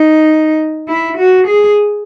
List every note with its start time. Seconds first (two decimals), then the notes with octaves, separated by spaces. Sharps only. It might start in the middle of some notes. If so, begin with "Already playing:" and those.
Already playing: D#4
0.87 E4
1.18 F#4
1.47 G#4